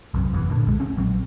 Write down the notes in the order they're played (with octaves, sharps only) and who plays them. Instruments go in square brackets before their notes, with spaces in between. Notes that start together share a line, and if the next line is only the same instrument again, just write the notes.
[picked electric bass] B1 F#2 C3
F#1 E2 G2 E3
A#2 D3
B1 G#3
G#3 C4 C#4
A#1 F#3 C4